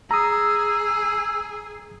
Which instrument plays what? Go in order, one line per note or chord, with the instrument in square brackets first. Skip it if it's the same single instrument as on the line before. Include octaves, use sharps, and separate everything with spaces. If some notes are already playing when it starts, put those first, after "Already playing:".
[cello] G#4 [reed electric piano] A#5 D#6 [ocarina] E6